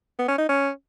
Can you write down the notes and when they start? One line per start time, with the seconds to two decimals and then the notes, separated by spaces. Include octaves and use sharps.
0.19 B3
0.28 C#4
0.38 D#4
0.49 C#4